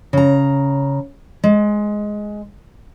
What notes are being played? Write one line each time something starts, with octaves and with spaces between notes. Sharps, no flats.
C#3 A#5
G#3